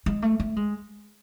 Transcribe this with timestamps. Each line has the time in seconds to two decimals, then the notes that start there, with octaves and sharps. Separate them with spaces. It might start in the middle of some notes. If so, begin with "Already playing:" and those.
0.06 G#3
0.22 A3
0.40 A3
0.56 G#3